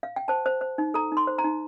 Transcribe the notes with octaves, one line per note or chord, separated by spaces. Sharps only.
F5
G5
C5 A5
C5
C5
D#4
A4 A#5
D#4 C6
C5
A#5
D#4